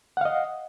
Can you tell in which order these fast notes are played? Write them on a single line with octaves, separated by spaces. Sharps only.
F#5 F5 D#5